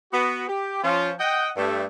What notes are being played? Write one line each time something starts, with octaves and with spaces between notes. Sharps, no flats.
B3 F#4
G4
F3 C#4 F4
D#5 F#5 G5
G2 A3